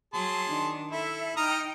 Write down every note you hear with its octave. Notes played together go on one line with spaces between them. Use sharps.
F#3 G#4 A5 C6
D#3 D4
E4 A4 E5
D#4 G5 A#5 D#6 F6